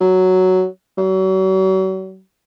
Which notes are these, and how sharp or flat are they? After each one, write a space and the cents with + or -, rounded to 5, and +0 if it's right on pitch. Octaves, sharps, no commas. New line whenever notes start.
F#3 +5
F#3 +40